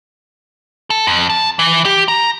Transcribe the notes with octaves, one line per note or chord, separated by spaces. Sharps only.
A4
F2
A5
E3
G4
A#5